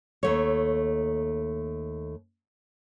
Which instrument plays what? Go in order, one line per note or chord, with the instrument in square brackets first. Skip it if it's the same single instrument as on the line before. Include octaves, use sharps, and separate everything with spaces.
[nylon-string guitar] D#2 A3 C#5